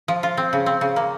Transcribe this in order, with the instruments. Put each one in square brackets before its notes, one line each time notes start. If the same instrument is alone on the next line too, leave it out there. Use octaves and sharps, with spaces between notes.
[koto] F3
F4
C4
C#3
C4
C#3
A#3